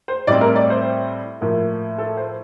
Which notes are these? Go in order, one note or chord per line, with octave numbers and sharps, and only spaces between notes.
C5
A2 G3 C4 D5
A#4
D5
C5
A2 F3 A#3
A4
C5